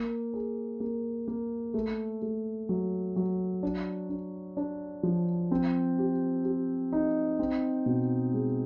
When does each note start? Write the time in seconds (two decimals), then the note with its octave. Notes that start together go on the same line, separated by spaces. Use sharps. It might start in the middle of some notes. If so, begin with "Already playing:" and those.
Already playing: A#3
0.34 G#4
0.80 A#3
1.28 A#3
1.74 A3
2.22 A3
2.69 F#3
3.16 F#3
3.63 D4
4.09 D4
4.57 D4
5.03 F3
5.51 C4
5.99 G4
6.44 G4
6.92 D#4
7.39 C4
7.86 B2
8.33 G#3